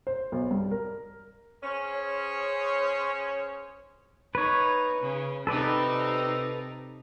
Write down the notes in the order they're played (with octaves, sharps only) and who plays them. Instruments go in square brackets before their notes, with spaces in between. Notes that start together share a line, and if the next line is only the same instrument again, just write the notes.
[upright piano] C5
B1
G2
A#4
[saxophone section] C#4 [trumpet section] G#4 C5 C#5
[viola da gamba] D#4 [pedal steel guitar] B4 C#5
[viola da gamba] C#3
[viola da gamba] C3 C4 D#4 [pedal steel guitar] A4 B4 D5